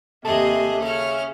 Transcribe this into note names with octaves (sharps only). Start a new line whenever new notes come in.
D#2 C3 G#4 A4 D#5 E5 A5
C#3 C#4 F6